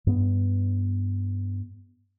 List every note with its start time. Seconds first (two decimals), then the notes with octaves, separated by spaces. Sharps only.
0.07 G2 B3